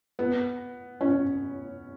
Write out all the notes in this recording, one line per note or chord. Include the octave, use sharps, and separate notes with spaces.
B3
C#4